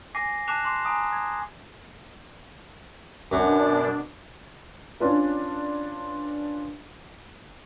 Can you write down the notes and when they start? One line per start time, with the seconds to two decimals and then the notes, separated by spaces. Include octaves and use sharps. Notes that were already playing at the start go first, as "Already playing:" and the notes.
0.15 G#5 D6 A#6 C7 D#7
0.48 A5 D6 F#6 C7 E7 F7
0.65 C6 D6 C7
0.85 G#5 A#5 D#6
1.12 G#6
3.32 F#2 B2 D4
5.00 C#4 D4 F4 B4